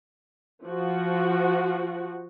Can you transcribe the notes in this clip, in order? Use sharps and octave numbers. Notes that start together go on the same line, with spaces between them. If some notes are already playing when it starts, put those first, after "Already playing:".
F3 F#4